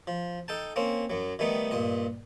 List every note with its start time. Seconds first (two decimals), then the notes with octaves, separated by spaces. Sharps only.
0.07 F3
0.48 D#4 A4 G5 A5
0.76 A#3 C4 C#4
1.10 F#2 F#3
1.39 D#3 G3 A3 B3 D#4
1.71 G2 A#2 D#5